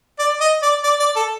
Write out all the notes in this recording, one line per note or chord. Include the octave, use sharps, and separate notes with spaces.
D5
D#5
D5
D5
D5
A4